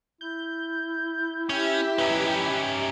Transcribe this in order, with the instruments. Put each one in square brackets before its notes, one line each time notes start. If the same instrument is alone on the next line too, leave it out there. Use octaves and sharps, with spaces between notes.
[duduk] E4 [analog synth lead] G6
[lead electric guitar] C#4 [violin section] G4 E5 [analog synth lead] G6
[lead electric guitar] C#4 D#4 [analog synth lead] B4